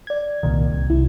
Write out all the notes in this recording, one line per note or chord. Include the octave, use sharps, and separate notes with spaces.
D5 G#6
C2 A#2 D#3
C2
C2 E4